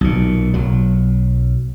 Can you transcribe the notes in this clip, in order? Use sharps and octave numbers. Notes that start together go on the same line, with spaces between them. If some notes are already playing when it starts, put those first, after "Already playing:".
B1 A#2
B1 F#3